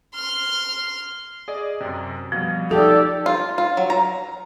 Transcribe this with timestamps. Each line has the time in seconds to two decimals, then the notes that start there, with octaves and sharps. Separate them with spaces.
0.14 C6 F6
1.48 G#4 D5 D#5
1.81 F#2 C3
2.32 B2 F3 G3
2.71 D#4 G4 A4 D5
3.26 F4
3.58 F4
3.77 F#3
3.90 A#5